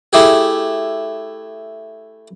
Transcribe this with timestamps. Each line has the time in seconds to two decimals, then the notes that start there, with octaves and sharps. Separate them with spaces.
0.13 A3 E4 G4 G#4